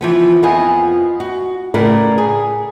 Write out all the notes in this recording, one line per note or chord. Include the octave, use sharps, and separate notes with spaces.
E3 F3 B3
F2 F3 B3 F4 D#5 G#5
F#4
A2 C#3 A#4 B4 D5
G#4